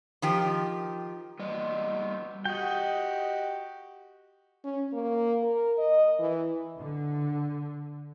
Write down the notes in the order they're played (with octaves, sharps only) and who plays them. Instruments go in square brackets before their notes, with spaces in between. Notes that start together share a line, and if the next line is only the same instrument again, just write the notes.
[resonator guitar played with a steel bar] D#3 F3 G4
[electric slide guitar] G3 B3 D#5
[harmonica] F#4 G4 [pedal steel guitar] D#5 G5
[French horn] C#4
A#3
A#4
D#5
E3
[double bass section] D3